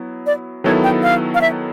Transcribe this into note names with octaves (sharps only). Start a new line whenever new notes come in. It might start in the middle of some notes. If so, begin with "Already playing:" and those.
Already playing: F#3 B3 E4
D5
D#3 F#3 B3 E4 A4 C#5
G5
F5
F5
E5